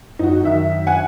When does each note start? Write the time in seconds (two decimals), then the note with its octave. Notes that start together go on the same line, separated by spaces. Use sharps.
0.19 F#2 D#4 F#4
0.44 D#3 E5
0.87 F#5 G#5